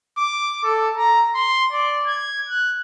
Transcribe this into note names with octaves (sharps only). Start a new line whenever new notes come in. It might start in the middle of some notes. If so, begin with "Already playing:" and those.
D6
A4
A#5
C6
D5
G#6
F#6